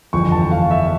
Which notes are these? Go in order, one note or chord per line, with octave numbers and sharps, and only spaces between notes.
G1 F2 E3 C#6
A5
F5
E5